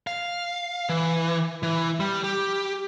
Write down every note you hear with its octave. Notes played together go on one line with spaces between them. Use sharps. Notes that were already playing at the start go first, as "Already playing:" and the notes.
F5
E3
E3
G3
G4